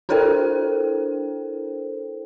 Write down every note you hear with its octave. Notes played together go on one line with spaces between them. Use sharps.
D4 E4 A4 A#4 C5 G5